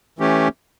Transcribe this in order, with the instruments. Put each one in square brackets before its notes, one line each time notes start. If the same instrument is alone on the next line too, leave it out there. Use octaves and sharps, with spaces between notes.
[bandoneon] E3 A3 C#4 G4